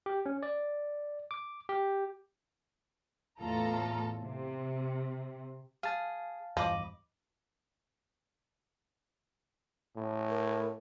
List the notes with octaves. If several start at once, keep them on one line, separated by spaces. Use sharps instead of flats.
G4
C#4
D5
D6
G4
E2 A2 F4 A4 A#5
C3
G#4 F5 A5
E2 G2 F3 D#5 B5 D6
A2
A#4